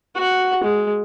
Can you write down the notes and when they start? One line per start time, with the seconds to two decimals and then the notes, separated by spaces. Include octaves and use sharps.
0.15 F#4 F#5
0.64 G#3